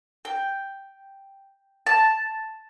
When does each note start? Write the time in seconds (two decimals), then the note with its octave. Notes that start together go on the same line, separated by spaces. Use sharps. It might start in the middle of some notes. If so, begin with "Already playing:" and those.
0.25 G5
1.87 A5